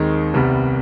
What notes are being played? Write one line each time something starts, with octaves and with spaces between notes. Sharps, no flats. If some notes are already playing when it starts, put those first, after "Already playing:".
Already playing: D#2 D#3 G#3 C4 D#4
C2 C3 G3 B3